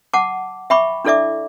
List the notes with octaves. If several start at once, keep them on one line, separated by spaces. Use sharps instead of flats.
F#5 A5 D6
E5 G5 B5 C#6 D6
D4 E4 A4 D5 E5 D6